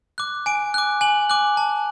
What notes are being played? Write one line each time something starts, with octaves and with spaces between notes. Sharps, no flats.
D6 F#6
G#5 D7
D6 F#6
G#5 F#7
D6 F#6
A5